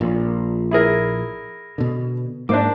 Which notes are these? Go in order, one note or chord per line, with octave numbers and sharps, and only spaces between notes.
A#1 A#2
E4 G#4 A#4
B2 D3
G#2 A#3 D4 C5 D6